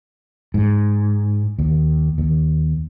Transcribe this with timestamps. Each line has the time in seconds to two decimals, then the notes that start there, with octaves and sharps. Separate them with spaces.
0.54 G#2
1.59 D#2
2.18 D#2